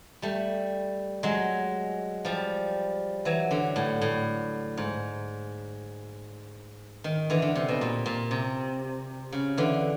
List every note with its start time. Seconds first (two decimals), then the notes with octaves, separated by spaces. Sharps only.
0.22 G3 A3
1.23 F#3 G#3
2.25 F3 G3
3.25 E3 F#3
3.51 D3
3.76 A2
4.01 A2
4.78 G#2
7.04 D#3
7.30 D3 E3
7.42 D3
7.55 C3
7.69 B2
7.81 A#2
8.06 A#2
8.31 C3
9.32 C#3
9.57 D3 E3